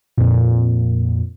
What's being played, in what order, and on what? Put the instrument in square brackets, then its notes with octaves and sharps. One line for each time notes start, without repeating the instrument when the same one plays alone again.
[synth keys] F2 A#2